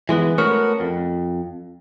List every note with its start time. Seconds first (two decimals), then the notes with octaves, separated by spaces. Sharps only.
0.09 E3 G#3 B3
0.38 A3 B3 C#4 F#4 A#4 C#5
0.80 F2